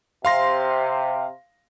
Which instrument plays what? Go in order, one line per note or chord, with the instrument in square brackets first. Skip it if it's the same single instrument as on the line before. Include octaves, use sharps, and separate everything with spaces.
[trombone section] C3 [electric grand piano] F5 C6 A#6